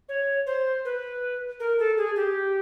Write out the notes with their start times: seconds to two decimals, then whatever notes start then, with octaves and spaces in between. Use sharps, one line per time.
0.09 C#5
0.47 C5
0.85 B4
1.60 A#4
1.79 A4
1.97 G#4
2.16 G4